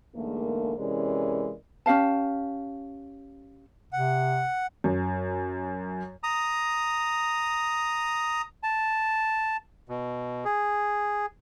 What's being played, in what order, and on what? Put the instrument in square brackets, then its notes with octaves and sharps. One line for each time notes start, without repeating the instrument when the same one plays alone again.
[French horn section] E2 G#2 D3 A3 A#3
C3 E3 G#3 C#4 A#4 D5
[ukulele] C#4 G4 F5 A5
[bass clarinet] C3 [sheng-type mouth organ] F#5
[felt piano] F#2
[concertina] A#5 D#6
[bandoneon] A5
B2
G#4